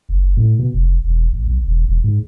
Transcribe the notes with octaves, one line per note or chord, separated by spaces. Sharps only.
F#1
A2
B2
F1
E1
A1
B1
E1
E1
G#2